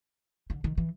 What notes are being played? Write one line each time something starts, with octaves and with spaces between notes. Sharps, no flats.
D3
D#3
E3